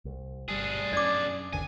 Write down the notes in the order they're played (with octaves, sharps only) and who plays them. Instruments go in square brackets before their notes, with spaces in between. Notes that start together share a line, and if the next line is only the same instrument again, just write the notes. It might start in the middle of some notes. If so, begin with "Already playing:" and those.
[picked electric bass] C2
[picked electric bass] G1 G3 [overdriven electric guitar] D4 G#4
[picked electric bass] F#2 [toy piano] D5 D6
[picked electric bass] G1 D#2 D3 [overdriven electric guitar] G#5